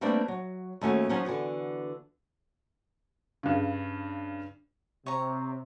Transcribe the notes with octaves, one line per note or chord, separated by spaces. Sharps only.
G3 A3 A#3 C4 D4 B4
F#3
D#2 A3 C#4 F#4
F3 F#3 C#4 D#4 F#4
D3 E3 B3 F#4
G2 C#3
C3 C#5 A#5